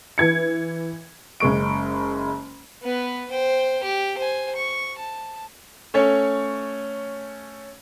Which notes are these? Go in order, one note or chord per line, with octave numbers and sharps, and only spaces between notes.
E3 G#6 C#7
F#1 C#3 G#3 C#6 D7
B3 B4
C5 G5
G4
C5 G#5
C#6
A5
A3 C#4 C#5